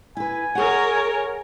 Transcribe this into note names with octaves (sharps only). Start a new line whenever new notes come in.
E4 B4 G#5
G#4 A#4 C#5 F#5